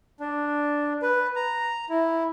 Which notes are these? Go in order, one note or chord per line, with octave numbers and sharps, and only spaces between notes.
D4
B4
A#5
E4